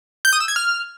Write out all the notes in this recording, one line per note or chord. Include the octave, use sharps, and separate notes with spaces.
G6
D#6
E6
G#6
F6